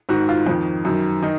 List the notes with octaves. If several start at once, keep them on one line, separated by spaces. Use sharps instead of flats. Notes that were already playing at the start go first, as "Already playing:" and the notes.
G#2 D#3 F#4
F4
F2 D#3
F#2 D#3
D#3 D#4